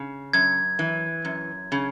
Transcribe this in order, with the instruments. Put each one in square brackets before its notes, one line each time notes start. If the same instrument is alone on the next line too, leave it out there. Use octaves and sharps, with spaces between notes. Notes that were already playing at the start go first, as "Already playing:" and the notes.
Already playing: [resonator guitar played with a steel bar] C#3
[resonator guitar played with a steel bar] F#2 [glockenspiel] G#6
[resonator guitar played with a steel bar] E3
F#2
C#3